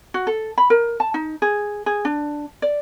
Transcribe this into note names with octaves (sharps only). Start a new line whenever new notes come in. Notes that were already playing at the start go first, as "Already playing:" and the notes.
F#4
A4
B5
A#4
A5
D#4
G#4
G#4
D4
D5